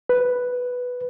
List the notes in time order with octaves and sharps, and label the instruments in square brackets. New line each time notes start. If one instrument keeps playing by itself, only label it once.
[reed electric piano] B4